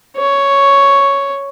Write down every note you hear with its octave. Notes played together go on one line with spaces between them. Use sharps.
C#5